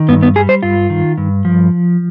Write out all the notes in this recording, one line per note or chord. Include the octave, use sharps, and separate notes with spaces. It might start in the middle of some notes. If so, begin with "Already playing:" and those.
Already playing: D#3
G2 B3
B3
G3 G#4
C5
G2 F4
D#3
G2
F3